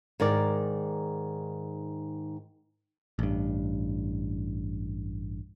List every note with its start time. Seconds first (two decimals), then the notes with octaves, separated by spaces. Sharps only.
0.20 G#2 D#3 A#4 D5
3.19 A1 G2